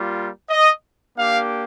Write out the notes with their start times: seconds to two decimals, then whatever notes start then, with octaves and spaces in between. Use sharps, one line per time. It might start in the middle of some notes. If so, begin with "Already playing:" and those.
Already playing: G3 A#3 F4
0.49 D#5
1.18 A#3 D4 G4 F5